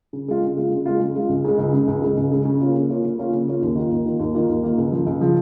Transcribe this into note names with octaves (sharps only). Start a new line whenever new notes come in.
C#3
G#3 F4
C#3
G#3 F4
C#3
G#3 F4
C#3
G#3 F4
C#2
C#3 G#3
C#2
C#3 G#3
C#2
C#3 G#3
C#2
C#3 G#3
C#3
A#3 C#4 F4
C#3
A#3 C#4 F4
C#3
A#3 C#4 F4
C#3
A#3 C#4 F4
D#2
D#3 A#3 F4
D#2
D#3 A#3 F4
D#2
D#3 A#3 F4
D#2
D#3 A#3 F4
C#2
C#3 F3
C#2
C#3 F3